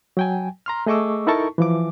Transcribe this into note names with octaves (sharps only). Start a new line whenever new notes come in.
F#3 G5 G#5
A#5 C6 F6
A3 G#4 D#5 C#6 D6 E6
D#4 E4 A4 A#4 A5 C#6
E3 F3 D6